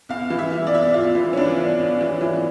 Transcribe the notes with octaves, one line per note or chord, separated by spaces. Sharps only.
E2 F5
E3
E5
E3
D5
E2 E5
D5
E2 F4
E3
C#4
E3 D4
E2
E2
E3
E3